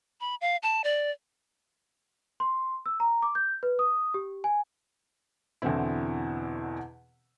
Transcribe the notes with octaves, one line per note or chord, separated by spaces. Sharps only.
B5
F5
A5
D5
C6
E6
A#5
D6
G6
B4
D#6
G4
G#5
E2 B2 D3 E3 C4 E4